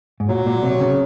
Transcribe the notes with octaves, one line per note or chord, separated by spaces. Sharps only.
G#2
A#2 F#3
A#2
C3
C#3